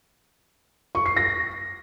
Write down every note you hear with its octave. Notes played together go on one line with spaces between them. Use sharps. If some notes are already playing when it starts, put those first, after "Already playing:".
C#6
C7
A#6